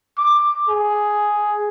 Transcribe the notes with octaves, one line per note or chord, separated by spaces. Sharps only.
D6
G#4